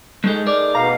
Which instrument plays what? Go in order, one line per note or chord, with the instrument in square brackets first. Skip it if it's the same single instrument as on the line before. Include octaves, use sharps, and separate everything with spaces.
[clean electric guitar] G#3 A4 [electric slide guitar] A3 D#4 G#4
[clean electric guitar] A#4 D5 [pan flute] D6
[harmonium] B2 F5 [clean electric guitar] A#5